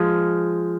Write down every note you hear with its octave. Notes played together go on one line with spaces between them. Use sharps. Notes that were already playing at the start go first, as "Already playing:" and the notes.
Already playing: F3 G#3